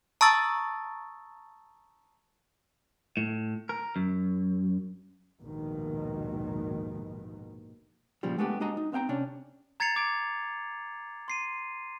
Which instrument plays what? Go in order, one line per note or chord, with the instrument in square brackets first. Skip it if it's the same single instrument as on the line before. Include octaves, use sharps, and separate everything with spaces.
[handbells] A5 A#5 C#6 D#6 E6 A6
[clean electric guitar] A2
A#4
F#2
[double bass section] A#1 D#2 G#2 B2 D#3
[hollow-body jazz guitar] A#2 C#3 F3 G3
G#3 A3 B3 D4 G4
G#3 D4 F#4 D#5 A#5
D#4
B3 C4 F5 G5 A#5
C3 C#4 D4
[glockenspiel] A#5 G#6 A6 C7 C#7 F7
D6 G#6 D7
C6 C7 D#7